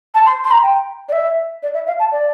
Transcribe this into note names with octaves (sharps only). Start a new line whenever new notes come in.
A5
C6
C6
A#5
G5
D5
E5
D5
E5
F5
A5
D5